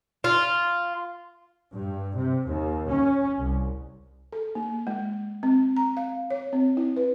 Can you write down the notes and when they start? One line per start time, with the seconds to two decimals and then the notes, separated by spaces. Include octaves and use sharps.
0.24 F4
1.73 G2
2.15 C3
2.46 D#2
2.89 C#4
3.39 C2
4.32 A4
4.55 A#3
4.87 G#3
5.43 C4
5.77 A#5
5.97 F5
6.30 C#5
6.53 C4
6.77 E4
6.97 B4